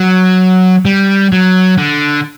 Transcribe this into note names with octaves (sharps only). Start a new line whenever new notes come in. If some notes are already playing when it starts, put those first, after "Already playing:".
Already playing: F#3
G3
F#3
D3